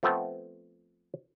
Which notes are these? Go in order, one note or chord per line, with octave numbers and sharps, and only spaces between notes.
F3 A3 B3 C4